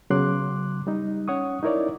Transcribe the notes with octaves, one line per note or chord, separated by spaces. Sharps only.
C#3 F#3 B3 C6 D6 F#6
G3 D#4
C#4 C#5 F#5 C#6 D#6
D#4 E4 A#4 C#5 D5